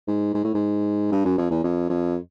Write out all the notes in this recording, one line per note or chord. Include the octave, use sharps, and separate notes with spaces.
G#2
G#2
A2
G#2
G2
F#2
F2
E2
F2
F2